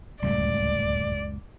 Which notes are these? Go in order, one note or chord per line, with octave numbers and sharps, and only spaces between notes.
D1 C#2 F#2 A#2 G3 A3 D5